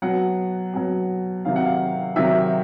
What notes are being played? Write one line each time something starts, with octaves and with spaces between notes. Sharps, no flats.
B2 F#3 F#5
B2 F#3
C3 D#3 F#3 F5
F#5
F5
C3 D#3 F#3 E5